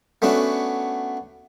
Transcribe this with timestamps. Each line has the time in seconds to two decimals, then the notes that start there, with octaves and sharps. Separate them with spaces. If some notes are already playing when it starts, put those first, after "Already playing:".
0.22 A3 B3 C#4 D4 F#4